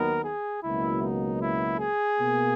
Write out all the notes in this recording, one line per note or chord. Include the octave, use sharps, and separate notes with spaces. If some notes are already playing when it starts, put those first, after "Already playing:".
Already playing: D#2 D#3 F#3 B3 A#4
G#4
C#2 B2 F#3 A#3 E4
D#4
E4
G#4
B2 A#3